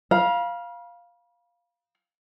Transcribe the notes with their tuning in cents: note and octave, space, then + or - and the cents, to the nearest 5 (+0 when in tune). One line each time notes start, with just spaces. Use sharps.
F5 +0 B5 -40